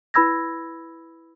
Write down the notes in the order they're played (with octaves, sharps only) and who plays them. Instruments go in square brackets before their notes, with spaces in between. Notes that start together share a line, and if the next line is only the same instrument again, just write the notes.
[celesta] E4 B4 B5 E6 G#6 A#6